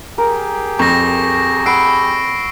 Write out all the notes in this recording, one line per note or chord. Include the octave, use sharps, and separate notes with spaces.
G4 G#4 A#4
F2 C#6 A#6
F#5 B5 C#6 E6 C7 D7